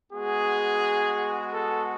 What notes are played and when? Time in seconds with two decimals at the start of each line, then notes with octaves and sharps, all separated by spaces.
0.12 G#3 B3 F#4 G#4
1.52 A4